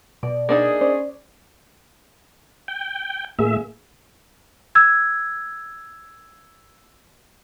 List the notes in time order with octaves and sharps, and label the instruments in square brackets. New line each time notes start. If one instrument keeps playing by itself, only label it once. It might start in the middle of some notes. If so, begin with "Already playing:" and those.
[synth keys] B2 [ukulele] D5
[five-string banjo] A#3 D4 D#4 [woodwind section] G#4
[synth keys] C#4 C5 [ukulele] D5
[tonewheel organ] G5
[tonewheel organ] A2 E5 [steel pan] A#3 G#4
[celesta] E6 G#6